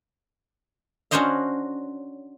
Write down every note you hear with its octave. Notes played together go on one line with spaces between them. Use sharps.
C#4 D4 F#4 C5 D#5 F5